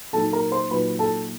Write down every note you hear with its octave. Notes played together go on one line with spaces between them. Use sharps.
A#2 F#3 A#3 D#4 A4 A5
A#4 A#5
C5 C6
A#2 F#3 A#3 D#4 B4 B5
A4 A5